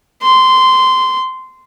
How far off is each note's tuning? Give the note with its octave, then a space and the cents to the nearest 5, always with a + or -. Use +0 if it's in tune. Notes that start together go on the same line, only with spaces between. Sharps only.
C6 -15